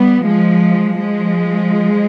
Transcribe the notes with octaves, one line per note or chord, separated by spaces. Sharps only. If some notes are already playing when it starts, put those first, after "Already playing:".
Already playing: G3 B3
F3 G#3
F3 G#3